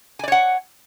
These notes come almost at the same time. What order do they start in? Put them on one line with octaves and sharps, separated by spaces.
G#5 D5 C#5 F#5